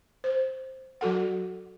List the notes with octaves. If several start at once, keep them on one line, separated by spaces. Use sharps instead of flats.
C5
F#3 F#4 A4 F#5